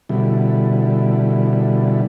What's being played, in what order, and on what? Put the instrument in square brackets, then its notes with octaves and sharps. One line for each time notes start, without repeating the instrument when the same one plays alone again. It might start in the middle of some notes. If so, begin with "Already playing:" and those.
[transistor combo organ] B2 D3 G3 E4